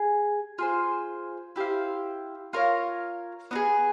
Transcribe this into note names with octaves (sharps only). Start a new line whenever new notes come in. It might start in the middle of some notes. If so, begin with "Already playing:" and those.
Already playing: G#4
F4 G#4 C5
E4 G4 C5 F5
F4 A#4 C#5
B3 D#4 G#4